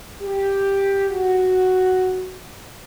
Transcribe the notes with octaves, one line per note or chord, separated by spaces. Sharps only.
G4
F#4